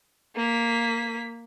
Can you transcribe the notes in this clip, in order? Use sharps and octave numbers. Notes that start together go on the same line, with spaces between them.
A#3 B6